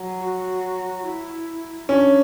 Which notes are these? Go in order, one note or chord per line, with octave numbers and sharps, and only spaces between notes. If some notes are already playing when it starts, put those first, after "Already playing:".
Already playing: F#3
F#4
E4
C#4 D4